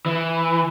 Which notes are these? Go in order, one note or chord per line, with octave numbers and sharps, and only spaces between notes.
E3